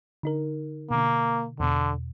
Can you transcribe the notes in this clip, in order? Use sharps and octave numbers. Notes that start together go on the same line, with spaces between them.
D3 D#4 A#4
B2 D3 A#3
E2 B2 D3